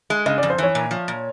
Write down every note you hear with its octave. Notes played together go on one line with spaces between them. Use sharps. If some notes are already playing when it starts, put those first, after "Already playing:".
G#3
C#3 D#5
D5
F2
C5
E3 C#5
A#2
F3
A#2